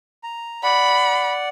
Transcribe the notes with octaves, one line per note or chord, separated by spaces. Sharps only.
A#5
D5 F#5 B5